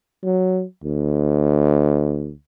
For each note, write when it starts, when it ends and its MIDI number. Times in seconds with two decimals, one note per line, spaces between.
0.24 0.64 54
0.84 2.32 38